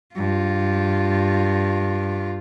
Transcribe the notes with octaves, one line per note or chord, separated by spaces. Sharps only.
G2 F4